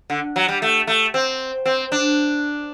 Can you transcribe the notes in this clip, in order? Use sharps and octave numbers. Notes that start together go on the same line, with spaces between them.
D3
F#3
G3
A3
A3
C4
C4
D4